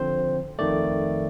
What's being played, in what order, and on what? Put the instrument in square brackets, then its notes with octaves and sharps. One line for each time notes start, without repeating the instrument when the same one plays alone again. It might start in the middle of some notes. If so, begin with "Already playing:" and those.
Already playing: [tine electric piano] D3 F3 C4 C5
F2 D#3 A3 D5